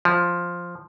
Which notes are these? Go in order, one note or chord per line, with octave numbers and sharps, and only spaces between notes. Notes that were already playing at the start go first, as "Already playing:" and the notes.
F3